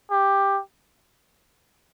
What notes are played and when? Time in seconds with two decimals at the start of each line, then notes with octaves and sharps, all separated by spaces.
0.11 G4